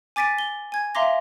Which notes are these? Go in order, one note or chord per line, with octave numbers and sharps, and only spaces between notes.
G#5 D6 A6 B6 D7 D#7
G7
G#5 G#6
E5 F5 A#5 C6 D6 A#6